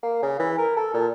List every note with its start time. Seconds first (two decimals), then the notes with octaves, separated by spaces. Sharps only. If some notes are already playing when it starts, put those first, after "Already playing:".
0.03 A#3
0.23 C#3
0.39 E3
0.58 A#4
0.76 A4
0.94 A#2